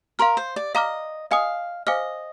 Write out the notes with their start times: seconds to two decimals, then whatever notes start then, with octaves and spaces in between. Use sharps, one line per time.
0.19 A#4 F5 C6 F6
0.37 C5
0.56 D5
0.75 D#5 F5 A#5 D6 F6
1.31 D#5 F5 G#5 D#6
1.87 C5 D#5 F5 G#5 D6 F6